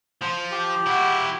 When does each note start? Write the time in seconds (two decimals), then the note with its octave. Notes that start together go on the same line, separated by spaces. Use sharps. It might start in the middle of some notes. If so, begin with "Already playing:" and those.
0.21 F3
0.51 G4
0.86 E4 F#4